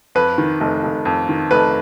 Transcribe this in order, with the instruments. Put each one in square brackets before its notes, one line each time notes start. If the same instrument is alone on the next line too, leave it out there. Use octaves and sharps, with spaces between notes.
[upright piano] F2 B4
D#3
F1
F1
F2
D#3
F1 B4